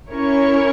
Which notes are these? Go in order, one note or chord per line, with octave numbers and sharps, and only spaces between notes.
C#4 E4 A#4 C#5